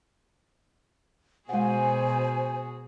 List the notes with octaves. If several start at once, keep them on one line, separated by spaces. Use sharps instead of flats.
B2 G#3 F#4 G#4 C5 F#5 G#5